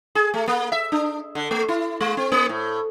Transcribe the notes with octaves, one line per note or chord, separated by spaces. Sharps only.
G#4
A3
A#3
E5
D4
D3
A3
E4
G#3
C4
A#3
A2